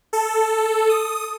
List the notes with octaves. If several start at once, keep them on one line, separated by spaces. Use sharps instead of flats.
A4
D#6